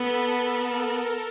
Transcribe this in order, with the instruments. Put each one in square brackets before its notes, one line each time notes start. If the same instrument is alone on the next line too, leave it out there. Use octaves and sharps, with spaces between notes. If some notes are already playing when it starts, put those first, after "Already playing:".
Already playing: [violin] B3 [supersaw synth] A4
[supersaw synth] A#4